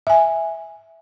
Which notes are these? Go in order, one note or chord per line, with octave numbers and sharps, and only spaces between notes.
E5 G#5